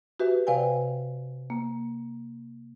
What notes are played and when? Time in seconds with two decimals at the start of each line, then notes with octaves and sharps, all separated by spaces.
0.20 F#4 G4 B4 E5
0.47 C3 B4 D5 F5 G5 G#5
1.50 A#3